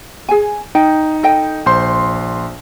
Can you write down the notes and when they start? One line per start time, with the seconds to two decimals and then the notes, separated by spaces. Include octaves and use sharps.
0.29 G#4 G#5
0.75 D#4 G5
1.23 A4 D#5 G5
1.66 A#1 C5 C6